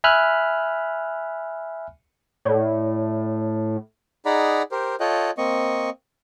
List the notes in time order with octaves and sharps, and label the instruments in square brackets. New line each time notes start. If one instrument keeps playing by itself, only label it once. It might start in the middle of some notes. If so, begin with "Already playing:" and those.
[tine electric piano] E5 G#5 B5 F6 F#6
[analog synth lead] A2 [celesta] C#5 D5
[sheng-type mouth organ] D#4 G#4 D5 F#5 A#5 B5
G4 A#4 C5
F4 A4 C#5 D#5 G5 F#6
A#3 C4 D#5 C#6